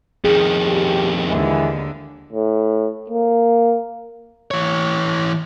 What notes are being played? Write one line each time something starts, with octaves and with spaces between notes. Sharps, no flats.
F2 D#3 G#4
G4
D#2 D3 E3 G#3
A2
A#3
E3 C#5